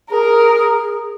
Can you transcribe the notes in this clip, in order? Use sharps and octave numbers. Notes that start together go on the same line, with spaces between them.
G#4 A#4